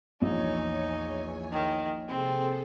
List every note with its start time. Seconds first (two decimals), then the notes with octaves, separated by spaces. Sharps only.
0.22 A#1 E2 D#4 C#5 G#5
1.52 D#3
2.08 C3 C4 G#4 A4